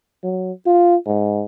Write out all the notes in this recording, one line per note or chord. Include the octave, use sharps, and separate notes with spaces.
F#3
F4
G#2